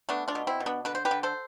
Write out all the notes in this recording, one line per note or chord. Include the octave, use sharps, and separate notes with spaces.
A3 B3 D4
D4 F4
B2
C4 E4
B2
B3 D4
D3 B4
C5
G4 B4
D3
A4 C5